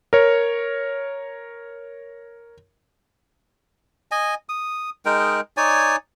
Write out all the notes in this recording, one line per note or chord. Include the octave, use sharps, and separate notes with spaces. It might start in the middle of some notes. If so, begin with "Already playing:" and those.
A#4 C#5
D#5 G#5
D#6
G#3 D#4 A#4 G5
D#4 C#5 D5 G#5